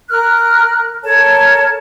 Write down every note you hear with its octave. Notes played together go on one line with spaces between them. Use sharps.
A#4 F6 F#6
A4 A#4 C#5 A5